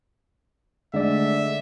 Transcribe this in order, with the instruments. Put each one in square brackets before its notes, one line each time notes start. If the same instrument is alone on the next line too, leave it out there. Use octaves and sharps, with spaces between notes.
[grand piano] D3 A3 [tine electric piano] G#3 D5 [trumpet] E5